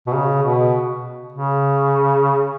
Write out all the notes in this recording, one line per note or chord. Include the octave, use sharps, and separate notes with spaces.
B2
C#3
B2
C#3